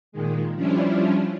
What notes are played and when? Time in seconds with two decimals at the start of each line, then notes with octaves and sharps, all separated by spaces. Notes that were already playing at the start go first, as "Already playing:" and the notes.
0.12 A#2 D#3 G#3
0.55 F3 G3 C#4 D4 E4 F4